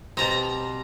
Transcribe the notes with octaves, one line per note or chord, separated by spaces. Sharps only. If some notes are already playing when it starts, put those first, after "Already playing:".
B2 G3 C4 A#5